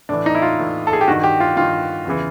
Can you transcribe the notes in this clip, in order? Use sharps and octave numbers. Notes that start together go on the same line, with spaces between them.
A2 E3 D4
D#4
E4
F4
A2 E3
A4
G#4
G4
G2 D#3 F#4
G4
F4
G2 D#3 F4
E2 C#3 E3